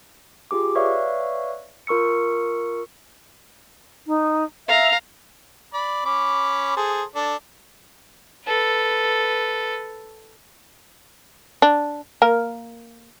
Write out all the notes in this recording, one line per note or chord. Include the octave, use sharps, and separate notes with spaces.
F4 G4 G#4 D6
B4 C#5 D5 E5 F5 C#6
F4 A#4 C#6 E6 C#7
D#4
E5 F5 A#5
D5 B5
C#4 B5 D6
G#4 A4 C5
D4 A4
A4 B4
D4
A#3 A#4